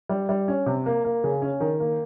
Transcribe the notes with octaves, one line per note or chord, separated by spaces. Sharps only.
G3
G3
C#4
C3
A#3
A#3
C#3
C#4
D#3
A#3